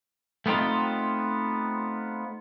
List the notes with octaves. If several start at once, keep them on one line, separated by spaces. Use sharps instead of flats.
A3 B3 C4 D#4 F4